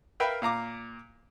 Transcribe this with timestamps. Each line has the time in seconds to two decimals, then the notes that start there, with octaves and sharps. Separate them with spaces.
0.20 A#4 B4 E5 F5 G5
0.42 A#2 F5 A#5 D6